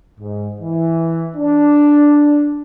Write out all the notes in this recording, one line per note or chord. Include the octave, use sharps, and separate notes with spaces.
G#2
E3
D4